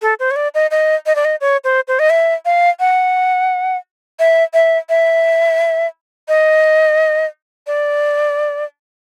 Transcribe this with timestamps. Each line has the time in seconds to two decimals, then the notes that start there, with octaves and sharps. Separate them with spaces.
0.02 A4
0.19 C5
0.31 C#5
0.36 D5
0.54 D#5
0.71 D#5
1.06 D#5
1.15 D5
1.25 D#5
1.41 C#5
1.64 C5
1.88 C5
1.99 D#5
2.10 E5
2.45 F5
2.80 F#5
4.19 E5
4.54 E5
4.89 E5
6.28 D#5
7.67 D5